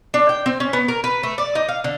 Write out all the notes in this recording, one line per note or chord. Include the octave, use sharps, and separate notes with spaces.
D4
G5
C4
C#4
B3
A#4
B4
A3
D5
D#4
F5
D3